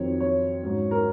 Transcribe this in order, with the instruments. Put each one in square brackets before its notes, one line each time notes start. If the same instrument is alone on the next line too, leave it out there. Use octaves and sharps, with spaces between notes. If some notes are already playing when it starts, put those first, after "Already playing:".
Already playing: [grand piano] F2 D#3 F#3 C4 C#5
C#5
G#2 F#3 C#4
A#4